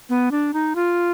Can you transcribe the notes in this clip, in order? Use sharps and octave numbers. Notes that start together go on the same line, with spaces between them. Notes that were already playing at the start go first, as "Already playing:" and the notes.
B3
D4
D#4
F4